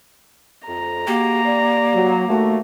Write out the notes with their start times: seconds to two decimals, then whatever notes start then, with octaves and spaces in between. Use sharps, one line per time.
0.67 F2 A#5
1.07 G#3 A#3 F#4 G4
1.45 G4 D5
1.94 F#3
2.29 D#2 A3 F#4